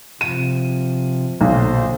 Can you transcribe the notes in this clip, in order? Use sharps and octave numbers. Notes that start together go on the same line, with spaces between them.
C3 F3 D#7
B1 A#2 D3 C5